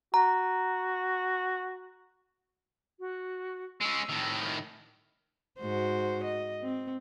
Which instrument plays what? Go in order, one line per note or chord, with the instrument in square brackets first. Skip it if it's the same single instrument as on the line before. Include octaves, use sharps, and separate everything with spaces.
[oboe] F#4 [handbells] A#5
[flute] F#4
[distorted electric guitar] G#3 C#4 [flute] E6
[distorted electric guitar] A2 D#3
[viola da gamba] G#2 F#4 C5
D#5
C4